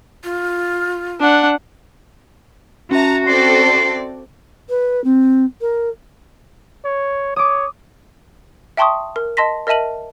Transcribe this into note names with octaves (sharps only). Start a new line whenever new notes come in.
F4
D4 F#5
C#4 F#4 E5 A5 A#5
C4 A4 D5 C6
B4
C4
A#4
C#5
C#5 D6 D#6
E5 G5 A5 C6 C#6 D#6
A#4
D#5 A5 C6 A#6 B6
A#4 D#5 E5 A5 D#7 F#7